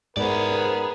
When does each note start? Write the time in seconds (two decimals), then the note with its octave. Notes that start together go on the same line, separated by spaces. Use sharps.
0.17 G#2 B3 G#4 A#4 C5 D5